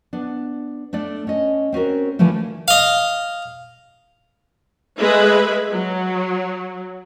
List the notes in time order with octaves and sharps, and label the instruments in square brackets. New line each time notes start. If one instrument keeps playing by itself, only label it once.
[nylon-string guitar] B3 D4
A3 D4 A4 D5
C#4 D#5
C4 C#4 F#4 A#4
D3 E3 F3 G3 A3
[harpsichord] D#5 F5
[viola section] G#3 A3 G#4 B4 E5 B5
F#3